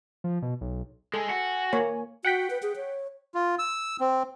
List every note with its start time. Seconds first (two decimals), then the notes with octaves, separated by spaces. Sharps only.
0.24 F3
0.42 B2
0.61 B1
1.14 G#3 A4 G#5
1.29 F#4
1.73 A#3 C#5
2.25 F#4 F#5 G5 B6
2.50 B4
2.63 G#4
2.76 C#5
3.34 F4
3.59 E6
4.00 C4